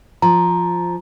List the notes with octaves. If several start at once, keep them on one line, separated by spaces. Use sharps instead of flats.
F3 A#5